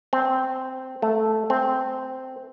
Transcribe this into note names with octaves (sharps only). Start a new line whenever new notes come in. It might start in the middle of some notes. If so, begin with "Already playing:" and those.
C4
A3
C4